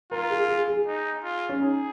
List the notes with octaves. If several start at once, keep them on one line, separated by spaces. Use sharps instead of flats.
F4 A#4
G#4
G#4
G#4
D#4
F4
C#4
D#4 G#4